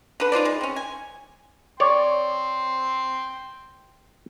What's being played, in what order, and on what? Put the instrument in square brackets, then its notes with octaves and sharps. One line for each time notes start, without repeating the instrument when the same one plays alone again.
[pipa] D3 B4
D#4 F4 C5 D5
G#3
C4 C#4
G#5
[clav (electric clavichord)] C#5 D5 [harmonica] G5 C6